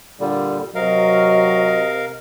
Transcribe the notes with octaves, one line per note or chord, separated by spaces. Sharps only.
A#2 D3 G3
C3 F#3 A#4 D#5 F5